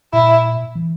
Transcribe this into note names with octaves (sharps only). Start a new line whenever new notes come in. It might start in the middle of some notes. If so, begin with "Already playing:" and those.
A#2 E4
E3